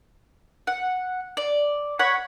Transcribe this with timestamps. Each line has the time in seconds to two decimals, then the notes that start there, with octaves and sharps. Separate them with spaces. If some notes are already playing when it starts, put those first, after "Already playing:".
0.67 F#5
1.37 D5
1.99 C#5 F#5 B5